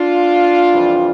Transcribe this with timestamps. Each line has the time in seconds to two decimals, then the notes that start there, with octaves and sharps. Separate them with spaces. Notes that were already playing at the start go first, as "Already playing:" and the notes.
Already playing: D4 F4
0.73 F2 C3 E3 G3